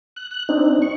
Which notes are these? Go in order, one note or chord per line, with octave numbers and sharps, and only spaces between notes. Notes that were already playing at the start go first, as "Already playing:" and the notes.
F#6
F#6
C4 D4 D#4
C#6